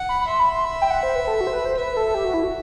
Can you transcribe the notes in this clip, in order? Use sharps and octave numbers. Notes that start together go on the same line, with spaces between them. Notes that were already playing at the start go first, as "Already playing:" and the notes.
Already playing: F#5
B5
B5
E5 C6
B5
C6
B5
G5
F#5
C5
B4
A4
F#4
C5
B4
C5
B4 E5
A4
G4
F#4
E4
F#4